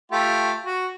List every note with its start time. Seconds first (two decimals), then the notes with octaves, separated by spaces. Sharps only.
0.12 A3 F4 G4
0.64 F#4